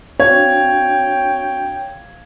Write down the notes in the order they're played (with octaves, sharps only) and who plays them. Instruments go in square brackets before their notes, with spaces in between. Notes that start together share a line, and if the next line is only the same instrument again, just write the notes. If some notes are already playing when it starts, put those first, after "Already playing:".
[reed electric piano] C4 D4 F#4 [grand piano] C#5 [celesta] F5 G#6 [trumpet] G5